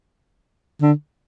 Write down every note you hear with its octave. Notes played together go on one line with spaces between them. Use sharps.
D3